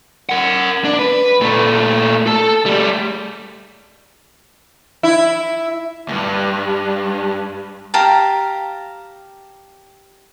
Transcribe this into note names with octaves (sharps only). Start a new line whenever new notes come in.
A#4 F#5
D4
B4
A#2 A3
A4 A5
G3 A3
E4
D2 G2
G4 F5 A5 A#5